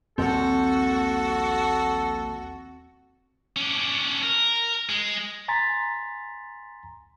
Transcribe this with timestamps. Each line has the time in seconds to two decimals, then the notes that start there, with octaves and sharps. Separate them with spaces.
0.18 A#1 D#2 G3 C4 F#4 A4
3.56 C#4 D4
4.23 A#4
4.89 G#3
5.48 G#5 A#5 C6 A6 B6